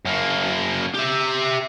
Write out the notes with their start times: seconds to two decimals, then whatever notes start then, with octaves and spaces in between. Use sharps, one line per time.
0.05 F#2 A#3
0.94 G4 E5